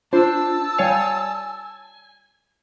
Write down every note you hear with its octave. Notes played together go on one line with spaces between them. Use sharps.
D4 F4 C5 A5 E6
G3 C#5 F5 G#5